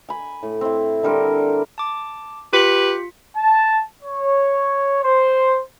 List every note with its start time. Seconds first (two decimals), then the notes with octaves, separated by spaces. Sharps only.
0.09 G#5 B5
0.43 A2
0.61 C4 E4
1.03 D3 G3 A#4 C6
1.78 A5 D6
2.53 F4 G4 B4 B6 C#7
3.36 A5
4.02 C#5
5.03 C5